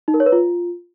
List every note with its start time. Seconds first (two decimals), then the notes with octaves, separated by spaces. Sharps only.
0.08 D#4
0.14 A#4
0.20 C#5
0.26 B4
0.32 F4